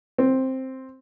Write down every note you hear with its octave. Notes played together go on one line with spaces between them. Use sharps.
C4